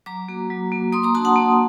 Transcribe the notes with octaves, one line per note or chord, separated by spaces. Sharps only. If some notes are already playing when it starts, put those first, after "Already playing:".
F#3 A#5 D6
A#3 F#4
F#3
A#3 F#4
A#3 C6 D#6
A#5 D6
D4 F#4 A5 C6
F#5 A5
A#3